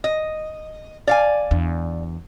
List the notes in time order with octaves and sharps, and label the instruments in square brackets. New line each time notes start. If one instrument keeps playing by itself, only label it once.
[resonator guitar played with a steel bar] D#5
D5 F5 G#5
[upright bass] E2 D4